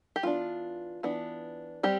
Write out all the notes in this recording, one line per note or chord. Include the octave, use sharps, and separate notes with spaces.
G4
E3 B3 D4 F4
E3 B3 D4
G3 C4 G4